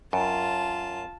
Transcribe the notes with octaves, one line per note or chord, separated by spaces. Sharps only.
F#2 F4 A5